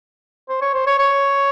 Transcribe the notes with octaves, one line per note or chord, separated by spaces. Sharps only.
C5
C#5
C5
C#5
C#5